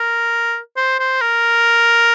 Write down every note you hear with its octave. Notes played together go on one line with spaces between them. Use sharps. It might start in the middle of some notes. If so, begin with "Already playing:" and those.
Already playing: A#4
C5
C5
A#4